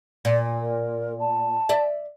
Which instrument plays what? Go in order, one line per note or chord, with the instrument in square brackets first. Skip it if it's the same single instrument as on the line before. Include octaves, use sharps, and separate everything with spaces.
[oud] A#2
[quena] A#4
A5
[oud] D5 E5